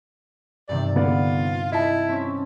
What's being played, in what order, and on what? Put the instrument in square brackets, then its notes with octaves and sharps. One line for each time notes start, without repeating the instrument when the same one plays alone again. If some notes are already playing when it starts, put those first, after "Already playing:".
[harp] G2 C3 D#3 [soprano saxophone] D5
[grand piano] D3 B3 D5 [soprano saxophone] F4
[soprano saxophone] E4 [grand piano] D#5 A5
[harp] C4 C#4